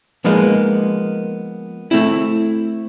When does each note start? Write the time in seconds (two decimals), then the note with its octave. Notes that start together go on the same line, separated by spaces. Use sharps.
0.24 F3 G#3 A#3 B3 D#4
1.91 A3 C4 E4